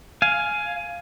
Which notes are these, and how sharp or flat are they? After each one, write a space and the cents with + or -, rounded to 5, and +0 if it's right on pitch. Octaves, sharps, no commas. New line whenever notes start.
F5 +0 G#5 +10